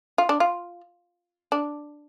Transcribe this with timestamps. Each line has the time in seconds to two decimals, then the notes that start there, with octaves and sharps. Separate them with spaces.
0.18 F4
0.29 D4
0.40 F4
1.52 D4